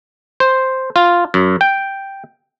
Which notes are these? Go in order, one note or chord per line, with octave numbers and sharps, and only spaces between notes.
C5
F4
F#2
G5